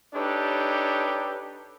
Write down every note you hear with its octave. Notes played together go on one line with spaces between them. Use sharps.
D4 D#4 G4 A4 B4 C#5